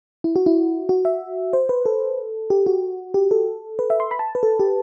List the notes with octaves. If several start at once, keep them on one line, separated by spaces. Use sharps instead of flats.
E4
F#4
E4
F#4
E5
C5
B4
A4
G4
F#4
G4
A4
B4
E5
C6
B5
A5
B4
A4
G4